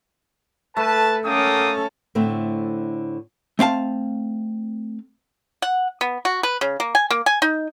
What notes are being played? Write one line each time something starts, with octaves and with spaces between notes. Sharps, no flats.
A3 B4 A5
A#3 C#4 A4 G5 D#6
A2 D3 A3 C4
A3 C4 F5 A5
F#5
B3
F#4
B4
C#3
A#3
G#5
A#3
G#5
D#4